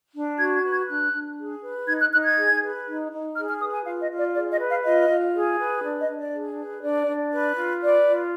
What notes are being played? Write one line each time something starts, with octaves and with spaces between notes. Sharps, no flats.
D4
F#4 G#6
G#6
B4
G#6
D4 F#6
D4
G#4
B4
D#4 G#6
F#6
D#4 F#6
G#6
G#4
B4
D#4
D#4
G#4 F6
F6
B4 D#6
G#5
F4 F5
D#5
F4
D5
G#4 D5
D#5
B4
F5
F4 D#5
F4
G#4
B4
D4
D#5
D4
D5
G#4
B4
D4 D5
D4
B4
F4
B4 D5
F4